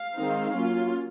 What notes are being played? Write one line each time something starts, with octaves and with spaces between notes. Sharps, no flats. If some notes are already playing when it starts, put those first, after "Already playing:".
Already playing: F5
D#3 G#3 C4 D#4
F#3 A#3 C#4 F4